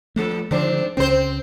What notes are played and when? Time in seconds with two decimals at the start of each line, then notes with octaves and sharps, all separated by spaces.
0.16 G2 F3 A3 A4
0.51 G#2 D3 D#3 F3 C4 D4
0.97 C#2 C#3 C4 C#4 C5
1.09 C4